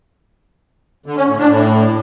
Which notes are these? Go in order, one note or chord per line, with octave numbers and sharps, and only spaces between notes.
D3
C#4
A2
D4
A2